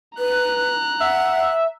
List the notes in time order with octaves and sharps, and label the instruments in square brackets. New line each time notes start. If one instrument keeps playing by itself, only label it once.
[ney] B4 [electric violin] A#5 F#6
[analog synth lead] E5 [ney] F#5